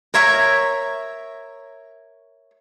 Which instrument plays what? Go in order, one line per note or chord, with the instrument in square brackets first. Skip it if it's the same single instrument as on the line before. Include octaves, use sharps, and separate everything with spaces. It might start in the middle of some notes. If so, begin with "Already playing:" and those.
[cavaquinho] A#4 C#5 E5 A#5